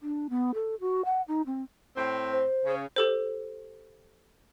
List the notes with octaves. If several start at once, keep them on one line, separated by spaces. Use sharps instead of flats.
D4
B3
A4
F#4
F#5
D#4
C4
A2 C4
C5
C#3
G4 A4 C5